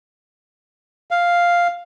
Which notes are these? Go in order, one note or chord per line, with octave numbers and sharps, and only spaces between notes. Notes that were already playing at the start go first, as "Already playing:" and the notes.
F5